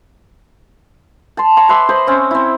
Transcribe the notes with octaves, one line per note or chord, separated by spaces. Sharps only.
A5 C6
C#5 A#5 C6 C#6
B4 E5 C6 D6
C5 D#5 B5 C6
C4 C#4
C4 E4